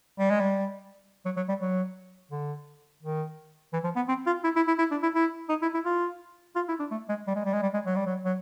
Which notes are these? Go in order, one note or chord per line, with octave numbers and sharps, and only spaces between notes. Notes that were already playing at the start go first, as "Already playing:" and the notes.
G3
G#3
G3
F#3
F#3
G3
F#3
D3
D#3
E3
F3
B3
C4
F4
E4
E4
E4
E4
D4
E4
E4
D#4
E4
E4
F4
F4
E4
D4
A3
G#3
G3
G#3
G3
G#3
G3
G#3
F#3
G3
F#3
F#3